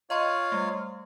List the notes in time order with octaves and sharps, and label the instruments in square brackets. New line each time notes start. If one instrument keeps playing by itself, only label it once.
[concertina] F4 C#5 F5 [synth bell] D#5 A#5 C6
[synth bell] G3 A3